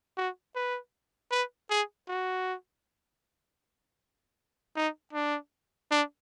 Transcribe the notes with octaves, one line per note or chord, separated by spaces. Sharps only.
F#4
B4
B4
G#4
F#4
D#4
D4
D4